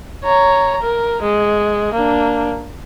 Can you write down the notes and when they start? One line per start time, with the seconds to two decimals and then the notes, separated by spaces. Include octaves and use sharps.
0.24 C#5 A#5
0.82 A#4
1.22 G#3
1.93 A#3 D4